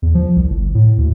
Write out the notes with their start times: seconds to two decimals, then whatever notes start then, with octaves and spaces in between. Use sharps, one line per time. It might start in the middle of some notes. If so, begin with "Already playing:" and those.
0.02 E2
0.15 F3
0.36 C2
0.50 G1
0.75 A2
0.98 D2